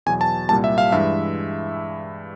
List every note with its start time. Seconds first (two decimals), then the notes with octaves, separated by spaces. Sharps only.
0.06 E2 B2 F#3 G#5
0.21 A5
0.49 C2 A#2 G3 A5
0.64 E5
0.78 F5
0.92 G2 E3 G#3 E5